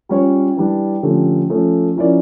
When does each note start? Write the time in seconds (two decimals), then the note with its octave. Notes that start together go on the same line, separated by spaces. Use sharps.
0.09 G3 C#4 F4 C#5
0.57 E3 G3 D4
1.03 D3 F3 A3 C#4 G4
1.50 F3 A3 C#4
1.96 F3 C#4 E4 A#4 D5